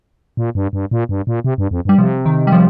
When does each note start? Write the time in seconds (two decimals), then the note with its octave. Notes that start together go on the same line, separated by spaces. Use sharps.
0.37 A#2
0.55 G2
0.73 G2
0.91 A#2
1.09 G2
1.27 A#2
1.44 C3
1.58 G2
1.71 F2
1.85 G2 G3
1.98 C3 F3
2.26 D#3
2.47 G3
2.52 F3